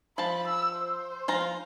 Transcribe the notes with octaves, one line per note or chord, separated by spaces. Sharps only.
F3 A5 B5
E6
C5
F3 F4 A#5